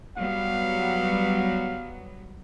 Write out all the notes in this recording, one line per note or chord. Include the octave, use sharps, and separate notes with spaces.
F#3 G3 B3 F5